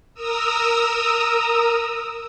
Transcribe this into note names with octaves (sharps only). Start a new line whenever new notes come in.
A#4 A#5 D#6 E6